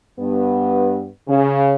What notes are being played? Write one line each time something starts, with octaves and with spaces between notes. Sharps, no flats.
G2 B3
C#3